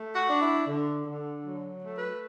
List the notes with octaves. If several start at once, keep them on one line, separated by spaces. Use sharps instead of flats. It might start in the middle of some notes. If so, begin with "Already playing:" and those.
Already playing: A3
F#4
D4
E4
D3
D3
F#3
A3
B4